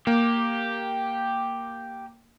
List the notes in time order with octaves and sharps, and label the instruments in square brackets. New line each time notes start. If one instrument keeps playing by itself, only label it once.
[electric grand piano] A#3 [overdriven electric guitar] G4